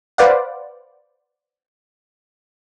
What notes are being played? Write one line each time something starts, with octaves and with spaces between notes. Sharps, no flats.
B4 C5 D5 F5 F#5